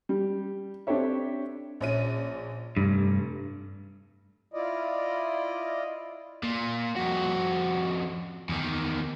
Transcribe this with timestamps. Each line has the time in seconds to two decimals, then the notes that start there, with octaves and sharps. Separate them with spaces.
0.09 G3
0.87 C4 D4 G4 A4 C#5 E5
1.81 A#1 C#4 D#7
2.77 F1 G2
4.54 E4 F4 D5 D#5
6.43 A#2
6.96 F2 F#4
8.49 E2 D#3